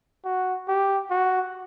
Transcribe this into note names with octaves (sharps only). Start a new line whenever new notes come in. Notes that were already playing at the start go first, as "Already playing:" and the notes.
F#4
G4
F#4